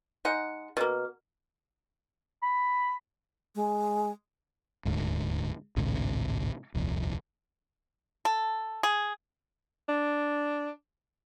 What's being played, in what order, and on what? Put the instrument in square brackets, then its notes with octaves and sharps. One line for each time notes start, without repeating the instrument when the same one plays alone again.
[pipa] G#3 D#4 F#5
B2 A#3
[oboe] B5
[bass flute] G#3
[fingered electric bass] D#1 D2 G#2
A1 D2 G#2 C3
D#1 C2 F2
[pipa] A4
G#4
[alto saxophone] D4